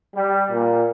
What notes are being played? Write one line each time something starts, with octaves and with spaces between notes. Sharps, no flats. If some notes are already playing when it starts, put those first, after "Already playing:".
G3
A#2